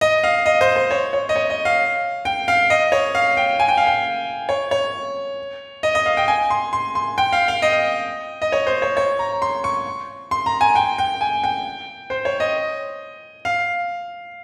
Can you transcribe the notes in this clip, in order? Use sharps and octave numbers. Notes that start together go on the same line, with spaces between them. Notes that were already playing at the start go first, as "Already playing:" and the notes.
D#5
F5
D#5
C5
C5
C#5
C#5
D#5
C#5
D#5
F5
G5
F5
D#5
C#5
F5
G5
G#5
G5
F5
G5
C#5
C#5
D#5
D#5
F5
G5
G#5
C6
C6
C6
G5
F5
F5
D#5
D#5
C#5
C5
C#5
C#5
A#5
C6
C#6
C6
A#5
G#5
G5
G5
G#5
G5
C5
C#5
D#5
F5